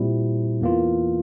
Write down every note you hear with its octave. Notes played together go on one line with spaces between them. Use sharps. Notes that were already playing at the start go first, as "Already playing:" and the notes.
Already playing: A#2 G3 C4 E4
E2 E3 A#3 F4